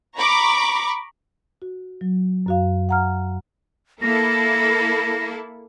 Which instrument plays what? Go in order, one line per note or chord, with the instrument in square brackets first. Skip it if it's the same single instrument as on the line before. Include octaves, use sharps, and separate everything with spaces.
[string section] A#5 B5 C#6 D6
[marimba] F#4
F#3
F#2 F#4 F5
F#5 A#5 F6
[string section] A#3 E4 A4 [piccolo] A#6